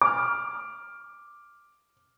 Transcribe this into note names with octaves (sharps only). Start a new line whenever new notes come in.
D6 F6